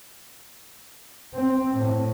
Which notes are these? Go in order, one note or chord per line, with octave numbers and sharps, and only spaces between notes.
C4
A2